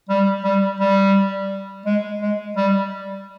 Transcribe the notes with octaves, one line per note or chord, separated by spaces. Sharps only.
G3
G3
G3
G#3
G#3
G3